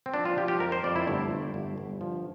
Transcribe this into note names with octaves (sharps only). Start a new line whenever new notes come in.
C4
F3 D4
F4
F3 G4
G4
F2 A#4
C5
F2 D5
E4
G1 A3
G1
G1
G1
F3